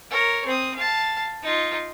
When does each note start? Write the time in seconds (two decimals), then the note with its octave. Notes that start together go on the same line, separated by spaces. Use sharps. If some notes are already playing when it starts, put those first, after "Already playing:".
0.11 A#4 C#5
0.46 C4 D#6
0.76 F5 A5
1.43 D#4 F4